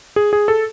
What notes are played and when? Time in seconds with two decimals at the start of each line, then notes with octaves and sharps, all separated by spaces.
0.16 G#4
0.33 G#4
0.48 A4